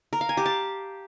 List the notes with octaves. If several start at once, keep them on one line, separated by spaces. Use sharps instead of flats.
A#4
F5
G#5
G4
A5